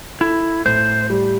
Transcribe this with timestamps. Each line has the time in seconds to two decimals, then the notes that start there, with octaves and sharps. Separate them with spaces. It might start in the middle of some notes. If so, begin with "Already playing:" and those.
0.20 E4 A4
0.65 A2 C5
1.10 G3